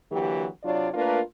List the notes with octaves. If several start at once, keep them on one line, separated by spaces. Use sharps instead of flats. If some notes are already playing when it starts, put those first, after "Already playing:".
D3 E3 F#3 A#3 G4
C3 F#3 D4 F4 C#5 D5
A3 A#3 D4 F4 A#4 B4